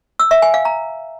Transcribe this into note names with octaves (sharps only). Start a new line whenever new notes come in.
E6
E5
G#5
F5
A#5